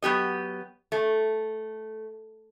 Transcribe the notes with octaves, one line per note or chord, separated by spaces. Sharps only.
F#3 B3 G4 D#5
A3